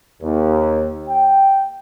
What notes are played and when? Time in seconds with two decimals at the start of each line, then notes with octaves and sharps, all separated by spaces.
0.22 D#2
1.08 G5